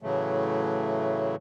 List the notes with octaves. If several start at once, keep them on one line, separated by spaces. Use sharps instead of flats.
A2 C#3 E3 F#3 A3